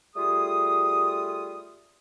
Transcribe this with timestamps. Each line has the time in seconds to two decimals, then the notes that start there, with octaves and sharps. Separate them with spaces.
0.16 G3 A3 F4 G#4 D#6